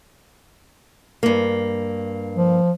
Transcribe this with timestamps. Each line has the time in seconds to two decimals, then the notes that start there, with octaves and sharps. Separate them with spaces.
1.23 G2 A#3
2.36 F3